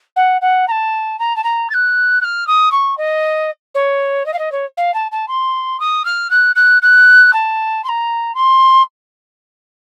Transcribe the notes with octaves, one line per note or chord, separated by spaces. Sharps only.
F#5
F#5
A#5
A5
A#5
A5
A#5
A6
F#6
F#6
F6
D#6
C#6
D#5
C#5
D#5
F5
D#5
C#5
F5
A5
A5
C6
D#6
F6
F#6
F#6
F#6
A5
C6
A#5
C6